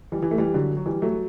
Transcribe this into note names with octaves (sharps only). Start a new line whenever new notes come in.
E3 G3
E3 G3
A3
E3 G3
D3 F#3
F#3
E3 G3
F#3 A3